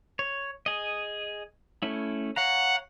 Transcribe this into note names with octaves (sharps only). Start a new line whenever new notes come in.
C#5
G#4 D#5
A3 C#4 E4
C#5 F5 F#5 A#5